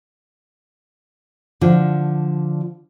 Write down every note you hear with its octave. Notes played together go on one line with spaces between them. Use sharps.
D3 F3